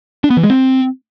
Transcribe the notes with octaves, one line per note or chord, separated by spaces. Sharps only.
D4
B3
E3
G#3
C4